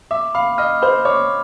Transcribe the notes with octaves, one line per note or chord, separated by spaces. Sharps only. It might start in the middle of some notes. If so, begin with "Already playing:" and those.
E5 D6
F5 B5
D#5 F6
C5 B5
C#5 D6